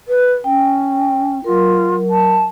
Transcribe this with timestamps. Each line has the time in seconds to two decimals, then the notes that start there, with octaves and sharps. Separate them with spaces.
0.08 B4
0.44 C#4 G5
1.44 F#3 F4 A#4
2.10 A5